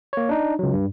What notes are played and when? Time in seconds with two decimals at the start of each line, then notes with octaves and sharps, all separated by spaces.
0.13 A#3 C#5
0.29 D4 D#4
0.59 C#2 F#3
0.74 G2